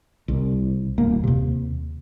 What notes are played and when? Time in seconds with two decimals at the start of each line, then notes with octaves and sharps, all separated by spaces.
0.28 C2
0.98 D#1 A#3
1.24 D#2 C3